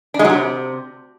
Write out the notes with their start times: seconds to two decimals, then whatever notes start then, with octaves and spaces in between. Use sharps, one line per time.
0.14 D4
0.19 G#3
0.24 F#3
0.30 C3